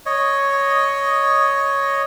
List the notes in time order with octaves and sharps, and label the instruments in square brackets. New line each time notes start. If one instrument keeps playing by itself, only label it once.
[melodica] C#5 D#5